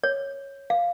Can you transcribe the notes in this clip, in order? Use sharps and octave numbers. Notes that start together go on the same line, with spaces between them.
C#5
F5